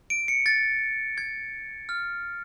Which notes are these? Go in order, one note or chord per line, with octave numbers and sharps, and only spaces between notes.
D7
C#7
A6
G#6
F6